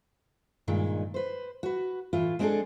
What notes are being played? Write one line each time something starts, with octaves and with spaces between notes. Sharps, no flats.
G2 A#2 D#3 G#3
B4 C5
F#4 B4
A2 E3 F4
G#3 C4 D4 F#4 G#4 A4